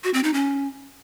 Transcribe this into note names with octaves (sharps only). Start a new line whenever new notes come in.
F#4
C4
D#4
C#4